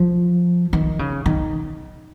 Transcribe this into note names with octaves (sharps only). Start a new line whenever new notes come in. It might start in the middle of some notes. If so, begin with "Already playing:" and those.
Already playing: F3
D#3
C#3
D#3